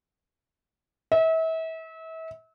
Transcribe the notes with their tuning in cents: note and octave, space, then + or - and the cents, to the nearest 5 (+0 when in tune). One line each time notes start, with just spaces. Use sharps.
E5 -35